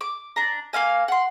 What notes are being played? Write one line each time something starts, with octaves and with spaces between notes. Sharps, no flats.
D6
D4 A#5
A#3 C#4 F5 G#5
F#5 C6